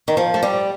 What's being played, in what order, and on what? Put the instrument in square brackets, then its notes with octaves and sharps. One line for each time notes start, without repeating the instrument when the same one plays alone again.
[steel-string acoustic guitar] D#3
F3
A3
G3